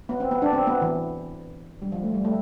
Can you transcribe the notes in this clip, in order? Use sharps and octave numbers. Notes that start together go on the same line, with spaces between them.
B3
C4
B3
D4
C4
B3
E3
G3
F3
A3
G3
A3